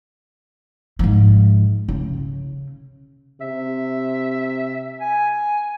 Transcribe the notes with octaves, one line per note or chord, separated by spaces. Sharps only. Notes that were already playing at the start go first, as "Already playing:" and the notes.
G#2 F3
C#3
C3 E5
G#5